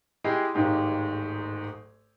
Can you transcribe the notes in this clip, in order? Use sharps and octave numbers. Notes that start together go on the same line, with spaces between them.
G#3 E4 G4 G#4
D1 G#1 G#2 G#3 A#3 G4